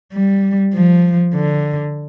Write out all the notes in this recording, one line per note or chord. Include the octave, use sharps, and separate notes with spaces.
G3
F3
D3